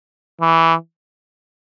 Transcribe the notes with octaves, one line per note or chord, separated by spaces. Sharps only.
E3